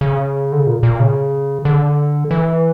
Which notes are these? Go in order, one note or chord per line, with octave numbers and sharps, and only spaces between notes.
C#3
D3
C#3
A#2
A#2
C#3
D3
E3